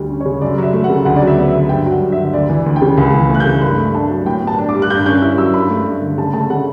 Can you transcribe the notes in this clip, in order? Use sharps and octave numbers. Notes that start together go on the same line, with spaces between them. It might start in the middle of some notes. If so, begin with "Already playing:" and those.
Already playing: D2 G3
C#4
C#3 C#5
F#2 D5
F#3 E5
A3
F#5
C#3
D2 F#5
D5
F#3
E5
B3
D3 E5
G2 G5
F#3 F#5
G2
E5
D3
D2 D5
E3
D2
G5
C#3
C#2 B5
E3
A3
F#6
G6
C#3
G2 B5
A3
D4 A5
F#3
A2 G5
B3
A5
D4
D6
G3
F#6
G2 G6
C#4 G6
E4
F#3 E6
G2 B5
A3
G2
D3
C#3 A5
A3 A5
C#3 F#5